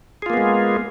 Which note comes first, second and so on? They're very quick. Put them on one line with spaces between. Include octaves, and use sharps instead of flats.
G#4 F4 A#3 B3 G#3